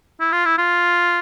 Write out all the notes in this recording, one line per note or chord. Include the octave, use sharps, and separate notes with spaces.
E4
F4
E4
F4